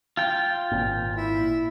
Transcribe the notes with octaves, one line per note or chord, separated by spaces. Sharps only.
F4 G5
G#1 A#2
E4